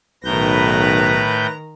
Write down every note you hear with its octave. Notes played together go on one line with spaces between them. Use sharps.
B1 A2 D#3 B4 A#5 G6 A#6